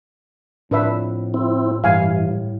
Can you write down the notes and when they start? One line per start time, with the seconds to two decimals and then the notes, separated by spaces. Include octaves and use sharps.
0.71 F2 A2 D4 B4 E5
1.34 C4 E4
1.84 G2 E3 G3 F5 G#5